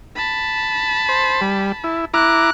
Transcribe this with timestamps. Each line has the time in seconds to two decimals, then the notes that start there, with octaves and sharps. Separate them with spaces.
0.16 A5 B5
1.09 C5
1.41 G3
1.84 E4
2.14 E4 A#5 D6 F#6